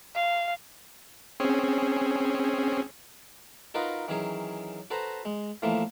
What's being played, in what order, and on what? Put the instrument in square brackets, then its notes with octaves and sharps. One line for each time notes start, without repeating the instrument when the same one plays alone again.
[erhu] F5
[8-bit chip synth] C4 C#4 G#4
[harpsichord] D#4 F4 F#4 A#4 B4 D#5
D#3 E3 F#3 C#4 G#4
F#4 A4 B4 C5 A#5
G#3
A2 E3 F3 A3 A#3